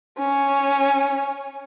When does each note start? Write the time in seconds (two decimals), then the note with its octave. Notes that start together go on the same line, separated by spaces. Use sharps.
0.18 C#4